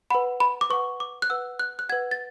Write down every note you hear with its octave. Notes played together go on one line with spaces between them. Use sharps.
B4 F#5 B5
B5
D6
B4 F#5 C#6
D6
F#6
B4 F#5 E6
F#6
F#6
B4 F#5 G#6
A6